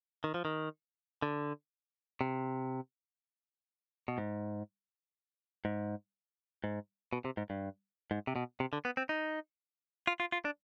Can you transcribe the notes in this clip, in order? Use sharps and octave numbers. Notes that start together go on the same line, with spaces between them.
D#3
F3
D#3
D3
C3
B2
G#2
G#2
G#2
B2
C3
G#2
G2
G#2
C3
B2
C3
D3
B3
C4
D#4
F4
F4
F4
D4